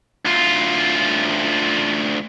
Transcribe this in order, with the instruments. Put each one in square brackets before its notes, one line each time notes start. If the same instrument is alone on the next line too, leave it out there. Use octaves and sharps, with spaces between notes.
[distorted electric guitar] D2 F4